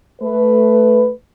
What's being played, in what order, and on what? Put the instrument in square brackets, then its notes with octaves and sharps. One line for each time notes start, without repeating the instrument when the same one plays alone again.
[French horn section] A3 B4